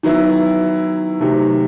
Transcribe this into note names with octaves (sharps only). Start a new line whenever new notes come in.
D#3 F#3 B3 E4
C3 D#3 F#3 A3